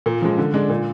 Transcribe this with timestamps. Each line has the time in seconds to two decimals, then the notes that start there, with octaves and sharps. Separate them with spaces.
0.06 A#2
0.22 F3 G#3
0.38 D3
0.54 G#3 D4
0.69 A#2